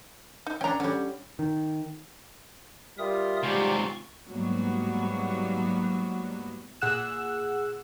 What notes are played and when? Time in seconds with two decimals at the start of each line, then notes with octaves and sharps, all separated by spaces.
0.46 D#4
0.61 C#4 D4 G5 A#5
0.80 D3 G3 C#4
1.39 D#3
2.98 G3 F4 A#4 E5 D#6
3.43 G#2 C3 G3 C#6
4.30 G#2 F#3 G3 A#3 B3 F#4
6.81 A#2 G#4 F#5 E6 F#6 E7